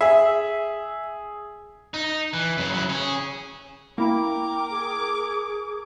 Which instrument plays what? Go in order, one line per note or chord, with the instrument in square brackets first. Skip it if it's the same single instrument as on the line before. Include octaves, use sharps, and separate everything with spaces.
[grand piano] G#4 [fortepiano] E5
[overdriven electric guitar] D#4
E3
F#2 C#3
F#3 E4
C#4 G#4
[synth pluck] A#3 E4 [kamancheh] A#4 D6 [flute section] G5 A#5
[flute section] G#4